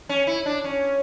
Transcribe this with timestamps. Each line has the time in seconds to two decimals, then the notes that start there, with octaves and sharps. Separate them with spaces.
0.09 C#4
0.27 E4
0.46 D4
0.64 C#4